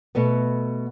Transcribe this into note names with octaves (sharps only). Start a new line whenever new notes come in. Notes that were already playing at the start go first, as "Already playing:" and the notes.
B2 A3 B3